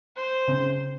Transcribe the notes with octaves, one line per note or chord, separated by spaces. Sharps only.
C5
C#3 C4